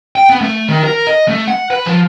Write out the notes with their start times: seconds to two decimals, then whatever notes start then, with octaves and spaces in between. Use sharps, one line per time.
0.16 G5
0.30 B3
0.41 A3
0.69 D#3
0.84 A#4
1.07 D#5
1.28 A3
1.48 F#5
1.70 B4
1.86 F3